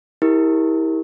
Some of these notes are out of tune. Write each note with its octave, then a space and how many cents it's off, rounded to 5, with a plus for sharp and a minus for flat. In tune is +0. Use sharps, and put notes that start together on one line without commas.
E4 -30 G4 +20 A#4 +0